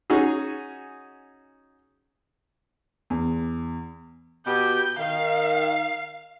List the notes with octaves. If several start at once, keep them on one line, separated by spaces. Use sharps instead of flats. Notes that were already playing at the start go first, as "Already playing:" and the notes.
C#4 D#4 F#4 G#4
E2
B2 G4 G6
D#3 F5